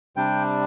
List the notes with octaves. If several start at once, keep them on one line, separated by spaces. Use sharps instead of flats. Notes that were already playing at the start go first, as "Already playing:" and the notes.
C3 G3 D4 G5